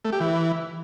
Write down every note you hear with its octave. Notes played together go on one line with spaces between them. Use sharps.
A3
G4
E3